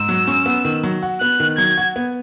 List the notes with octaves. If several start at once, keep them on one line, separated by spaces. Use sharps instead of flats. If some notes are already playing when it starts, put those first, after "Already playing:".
Already playing: G#2 E6
F#3
C#4
B3
D#3
F#3
F#4
B3 F#6
D#3
F#3 G#6
F#4
B3